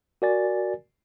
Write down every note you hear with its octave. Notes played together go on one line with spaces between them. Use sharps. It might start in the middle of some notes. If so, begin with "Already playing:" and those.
F#4 A#4 D5 G#5 A6